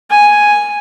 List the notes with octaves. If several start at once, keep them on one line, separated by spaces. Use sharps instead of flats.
G#5